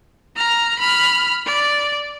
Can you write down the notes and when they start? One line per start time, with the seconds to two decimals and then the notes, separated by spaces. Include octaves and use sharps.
0.37 A#5 F6
0.79 B5 F6
1.46 D5